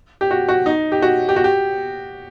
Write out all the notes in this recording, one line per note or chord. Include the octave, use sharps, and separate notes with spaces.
G4
F#4
F#4
D#4
G4
F#4
G4
F#4
G4